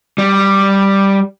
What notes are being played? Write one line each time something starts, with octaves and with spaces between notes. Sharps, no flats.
G3